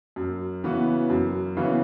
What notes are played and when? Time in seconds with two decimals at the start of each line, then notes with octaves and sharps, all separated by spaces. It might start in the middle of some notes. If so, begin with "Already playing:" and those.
0.16 F#2
0.64 C#3 E3 B3 F#4
1.10 F#2
1.57 C#3 E3 B3 F#4